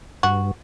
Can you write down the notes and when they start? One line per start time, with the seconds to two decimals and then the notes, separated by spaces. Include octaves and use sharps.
0.23 G2 F#4